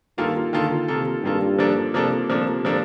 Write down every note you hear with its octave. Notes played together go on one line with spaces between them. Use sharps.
G2 D#3 A#3 F4 A4
D3 D#3 A#3 F4 A4
C3 D#3 A#3 F4 A4
G2 D#3 A#3 F4 A4
F3 A#3 D4 A4
C3 F3 A#3 D4 A4
C3 F3 A#3 D4 A4
F3 A#3 D4 A4